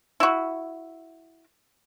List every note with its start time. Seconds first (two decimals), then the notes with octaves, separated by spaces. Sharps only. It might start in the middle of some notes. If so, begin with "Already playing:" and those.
0.20 E4 F#4